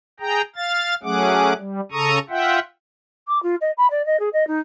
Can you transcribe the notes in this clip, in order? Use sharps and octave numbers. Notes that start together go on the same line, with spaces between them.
G#4 G5 A#5
F5 A6
F#3 A3 C#4 G#4 F#5 D6
G3
C#3 A4 A#5 C#6 D#6
F4 E5 F#5 G5
D6
F4
D#5
B5
D5
D#5
G#4
D#5
D#4